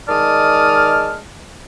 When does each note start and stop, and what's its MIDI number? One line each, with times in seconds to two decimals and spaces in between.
0.09 1.20 51
0.09 1.20 56
0.09 1.20 74
0.09 1.20 81
0.09 1.20 87
0.09 1.20 89